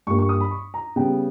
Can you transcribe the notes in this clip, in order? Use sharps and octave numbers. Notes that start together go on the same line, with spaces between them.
G2 G3 A#3 C#6
C#6
D#6
B5
C#6
A#5
C#3 G3 B3 G5